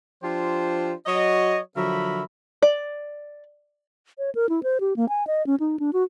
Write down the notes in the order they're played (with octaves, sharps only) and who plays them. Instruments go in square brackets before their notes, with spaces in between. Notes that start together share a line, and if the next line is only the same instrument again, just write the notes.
[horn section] F3 D4 F4 G4 C5
F#3 F#4 C#5 D#5
D3 F3 F#3 A#4 E5 B5
[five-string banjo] D5
[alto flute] C#5
A#4
E4
C5
G4
A#3
G#5
D#5
C#4
D#4
D4
F#4